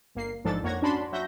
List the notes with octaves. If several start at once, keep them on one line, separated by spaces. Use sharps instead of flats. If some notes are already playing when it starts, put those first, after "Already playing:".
G1 A#3 C7
A1 G#2 F3 D4 A4 A6
F2 A#3 C#5 F#5 G#6 A#6
C#4 D4 F#4 A5 B5 C6
F#3 F#4 E5 G6 A#6